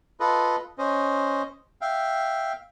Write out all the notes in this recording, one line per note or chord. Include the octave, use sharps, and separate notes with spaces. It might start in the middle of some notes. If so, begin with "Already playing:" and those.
F4 A4 B4 D#5
C#4 C5 D#5
E5 F5 G5